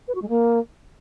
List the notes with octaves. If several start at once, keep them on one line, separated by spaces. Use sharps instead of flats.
B4
F#4
G#3
A#3